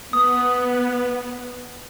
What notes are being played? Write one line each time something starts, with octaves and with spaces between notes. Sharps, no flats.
B3 D#6